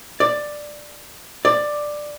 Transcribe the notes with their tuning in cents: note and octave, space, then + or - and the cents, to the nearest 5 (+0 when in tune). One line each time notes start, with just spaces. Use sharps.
D5 +10
D5 +10